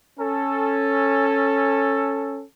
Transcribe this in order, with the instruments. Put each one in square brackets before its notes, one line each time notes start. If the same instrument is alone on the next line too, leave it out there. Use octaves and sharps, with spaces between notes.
[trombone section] C#4 A4